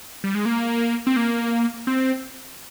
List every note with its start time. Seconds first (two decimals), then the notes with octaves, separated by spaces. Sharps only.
0.24 G3
0.35 G#3
0.45 A#3
1.07 C4
1.16 A#3
1.87 C4